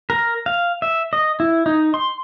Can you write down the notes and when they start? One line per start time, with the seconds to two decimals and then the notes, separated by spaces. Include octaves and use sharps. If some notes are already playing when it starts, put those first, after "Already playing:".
0.10 A#4
0.46 F5
0.82 E5
1.13 D#5
1.40 E4
1.66 D#4
1.94 C6